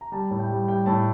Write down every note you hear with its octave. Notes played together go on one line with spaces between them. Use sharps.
A#5
G3 A5
A2
G5
G3
G3 G5
A2 A5